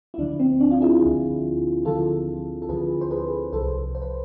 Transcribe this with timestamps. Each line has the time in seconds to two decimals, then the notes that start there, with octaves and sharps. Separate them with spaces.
0.14 E4
0.18 D2 D3 F3 D4
0.39 C4
0.60 D4
0.71 F4
0.82 E4 G#4
1.02 D2 D3 F3
1.85 D2 D3 F3 F4 A4
2.62 A4
2.69 D2 D3 F3 G#4 B4
3.01 C5
3.11 G#4 B4
3.53 C2 C3 F3 A4 C5
3.95 C5
4.02 B4